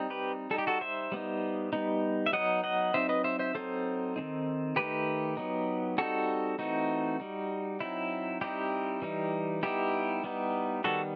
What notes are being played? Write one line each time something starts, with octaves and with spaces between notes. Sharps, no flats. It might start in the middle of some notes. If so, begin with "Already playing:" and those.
Already playing: G3 C4 D#4
G4 B4
G3 D#4 A4
G4
F#4 A4
C5 E5
G3 B3 D#4
G3 B3 D#4
E5
F#3 B3 D#4 D#5 F#5
D#5 F#5
F#3 C4 D#4 C5 E5
B4 D#5
C5 E5
C5 E5
F#3 C4 D#4 A4 C5
D#3 A3 C4 D#4
D#3 A3 D#4 G4 B4
F#3 B3 D#4
G3 C4 D#4 F#4 A4
E3 A3 C4 D#4 F#4
G3 D#4
F#3 C4 D#4 E4
G3 C4 D#4 E4 G4
E3 G3 D#4
G3 B3 D#4 E4 G4
G3 B3 D#4
D#3 G3 B3 F#4 A4